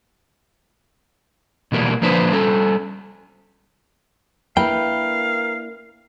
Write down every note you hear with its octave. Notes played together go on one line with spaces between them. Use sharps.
B2 E3 G3 A#3
F3 A#3 D4 B4 C5
G3 C#4 A4
A#3 D4 E4 A#4 B4 F5 G5